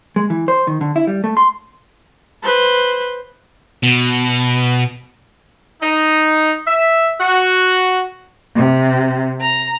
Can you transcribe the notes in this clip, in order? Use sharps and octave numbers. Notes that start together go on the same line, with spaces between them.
G#3
E3
C5
D#3
D3
E4
G3
A3
C6
B4 C5
B2
D#4
E5
F#4
C3
A#5